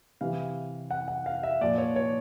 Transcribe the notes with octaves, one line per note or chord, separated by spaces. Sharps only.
C3 E3 F5
F#5
F#5
F5
E5
A#2 F3 D5
C#5
C#5